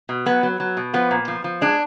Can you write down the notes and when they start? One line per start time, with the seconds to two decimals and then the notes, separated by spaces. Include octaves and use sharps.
0.09 B2
0.26 F#3 B3
0.43 F#3
0.60 F#3
0.77 B2
0.93 F3 B3
1.11 A#2
1.28 F3
1.44 F3
1.61 G#3 D4